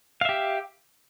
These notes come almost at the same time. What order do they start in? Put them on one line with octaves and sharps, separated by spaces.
F5 E5 G4